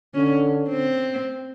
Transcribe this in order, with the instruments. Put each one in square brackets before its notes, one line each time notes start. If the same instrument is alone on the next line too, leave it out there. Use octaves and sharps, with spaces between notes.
[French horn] D3 [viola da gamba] C#4
[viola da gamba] C4